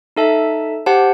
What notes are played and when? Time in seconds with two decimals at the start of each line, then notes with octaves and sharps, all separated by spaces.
0.17 D#4 A4 E5 A5
0.86 G4 C5 F#5 A5